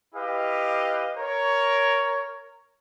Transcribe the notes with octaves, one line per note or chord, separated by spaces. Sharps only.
E4 G4 B4 D#5 F5
A#4 C#5